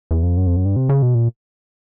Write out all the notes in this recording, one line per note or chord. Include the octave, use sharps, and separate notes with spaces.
E2
F2
F#2
F2
F#2
G2
C3
C#3
B2
A#2